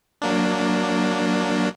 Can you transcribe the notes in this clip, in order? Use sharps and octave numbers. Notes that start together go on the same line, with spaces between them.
F#3 A#3 D4